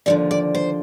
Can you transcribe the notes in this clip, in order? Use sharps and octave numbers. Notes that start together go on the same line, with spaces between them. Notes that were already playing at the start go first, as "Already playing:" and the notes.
D#2 D3 F3 G#3 D5
D5
C5